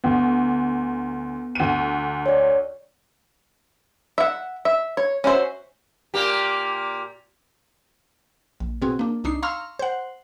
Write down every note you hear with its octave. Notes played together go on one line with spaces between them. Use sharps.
D2 B3
D2 D#7
C#5 D5
E5 F#5
E5
C#5
C#4 F#4 C5 E5
A#2 A#3 G4
A#1
B2 C4 F#4 G#4
A#3 D4
C2 D4 D#4 C7
F5 A#5 C6 C#6 E6 F6
C5 F#5